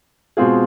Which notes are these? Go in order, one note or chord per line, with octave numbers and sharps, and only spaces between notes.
B2 G#3 C4 F4 G#4